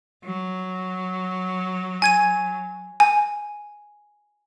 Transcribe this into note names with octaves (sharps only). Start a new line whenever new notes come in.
F#3
G#5 G#6 D#7
G#5